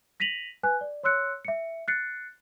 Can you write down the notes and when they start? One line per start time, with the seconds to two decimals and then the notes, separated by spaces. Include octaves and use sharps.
0.20 A#6 B6 D#7 F7 F#7
0.63 B4 G#5 F#6
0.81 D5
1.03 C#5 C6 E6 F#6 C#7
1.45 E5 C#7
1.88 F#6 A6 C7 C#7